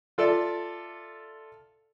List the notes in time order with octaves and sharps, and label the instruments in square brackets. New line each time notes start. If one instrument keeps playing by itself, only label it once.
[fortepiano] F4 A4 D5 E5